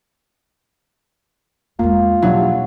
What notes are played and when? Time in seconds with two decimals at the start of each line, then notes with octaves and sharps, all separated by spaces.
1.79 E2 G#3 A#3 F4
2.22 B2 F#3 G3 D4 E4